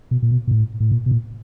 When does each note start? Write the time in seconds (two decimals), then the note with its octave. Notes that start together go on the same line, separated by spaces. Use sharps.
0.11 B2
0.22 A#2
0.31 B2
0.47 A#2
0.51 A2
0.80 A2
0.92 A#2
1.06 B2
1.11 A#2